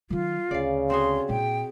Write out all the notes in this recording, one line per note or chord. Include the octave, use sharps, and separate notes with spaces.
D#3 F#3 F4
D2 C#3 D5 F5
C4 F#4 G#4 C6
A#2 E4 G5